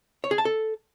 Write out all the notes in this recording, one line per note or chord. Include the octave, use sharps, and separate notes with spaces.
C#5
G#4
A5
A4